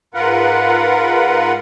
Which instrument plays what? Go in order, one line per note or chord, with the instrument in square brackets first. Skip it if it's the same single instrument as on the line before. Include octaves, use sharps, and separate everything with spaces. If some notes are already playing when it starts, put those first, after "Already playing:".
[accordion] G#2 F4 A#4 B4 F#5